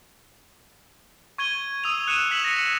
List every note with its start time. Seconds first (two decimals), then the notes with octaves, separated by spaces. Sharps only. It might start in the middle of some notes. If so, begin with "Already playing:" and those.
1.38 C#6 G#6 D#7 G7
1.84 D#6 E6 D#7 F7
2.07 F#6 C#7 D#7 E7
2.31 E6 B6 E7 F#7
2.44 A#6 C#7